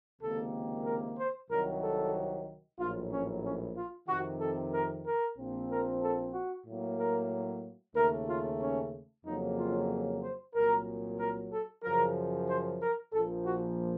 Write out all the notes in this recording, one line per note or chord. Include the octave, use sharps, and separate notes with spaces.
C#2 C3 D#3 A#3 A4
A#4
C5
C2 C3 D#3 F#3 A#4
A4
A#1 A2 F#3 F4
C#4
C#4
F4
F2 C3 D#3 F#4
A4
A#4
A#4
A#1 A#2 F3 C4
A#4
A4
F#4
A2 F#3 A#3
A#4
D#2 C#3 A3 A#4
F4
C#4
F2 C#3 F#3 A#3 D#4
F4
C5
C2 A#2 F#3 A#4
A#4
A4
F#2 C#3 F3 A#4
C5
A#4
A#1 A#2 F3 A4
F#4